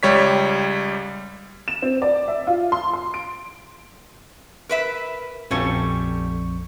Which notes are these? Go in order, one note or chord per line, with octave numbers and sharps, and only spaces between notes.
C#2 G3 C#5 B6
E7
C4
D5
E5
F4
C6
C6
D7
A#4 B4 E5
A#1 F2 G3 A3 C#4 C#6